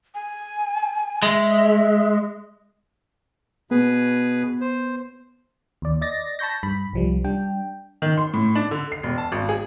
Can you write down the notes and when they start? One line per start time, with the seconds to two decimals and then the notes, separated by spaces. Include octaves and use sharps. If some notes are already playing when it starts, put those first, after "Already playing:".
0.14 G#5
1.23 G#3 E5
3.71 B2 B3 G#4 B4
4.61 C5
5.82 D#2 D5
6.01 D5 D#5 A6 A#6
6.39 A5 B5 C#6 G6 A#6
6.63 G2 B5
6.93 C2 F3 G3
7.24 G3 D4 G5
8.02 D#3
8.18 C6
8.33 A2
8.55 D4
8.71 D3
8.92 C7
9.03 E1
9.18 A5
9.32 G#1
9.49 G#4